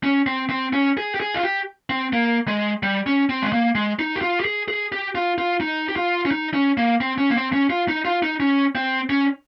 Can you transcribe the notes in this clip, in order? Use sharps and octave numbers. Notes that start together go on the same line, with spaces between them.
C#4
C4
C4
C#4
G#4
G4
G#4
F4
G4
C4
A#3
G#3
G3
C#4
C4
G#3
A#3
G#3
D#4
G4
F4
G4
G#4
G#4
G4
F4
F4
D#4
G4
F4
C#4
D#4
C#4
A#3
C4
C#4
A#3
C4
C#4
F4
D#4
F4
D#4
C#4
C4
C#4